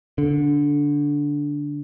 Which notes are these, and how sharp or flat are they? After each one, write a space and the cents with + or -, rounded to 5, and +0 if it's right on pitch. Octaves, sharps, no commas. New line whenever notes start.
D3 -10